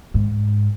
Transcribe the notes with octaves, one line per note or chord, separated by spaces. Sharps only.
G#2